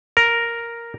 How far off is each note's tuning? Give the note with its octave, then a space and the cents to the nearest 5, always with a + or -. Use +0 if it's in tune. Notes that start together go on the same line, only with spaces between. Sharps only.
A#4 +0